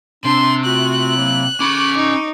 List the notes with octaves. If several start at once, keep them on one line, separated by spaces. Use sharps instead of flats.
C3 D4 C6
A3 F4 F#4 F#6
F#3 A#3 E4
C#4 B5 C#6 D6
D#4